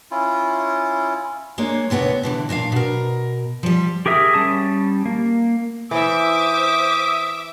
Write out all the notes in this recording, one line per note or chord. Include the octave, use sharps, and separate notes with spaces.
C#4 E4 F4
G#3 A#3 D4 C#5
D#2 C3 B3 G#4 C#5
B2 D3 E3
A#2 D4 E5 F5
B2 A#4
F3 G3
G4 G#4 A#4 E5 D#6
G3 C#4 A5 D#6
A#3
E3 C5 E5 D6 D#6